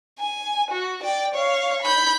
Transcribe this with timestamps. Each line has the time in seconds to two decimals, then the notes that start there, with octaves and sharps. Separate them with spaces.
0.19 G#5
0.71 F#4
1.03 D5 G5
1.35 C#5 F5
1.82 B5 G6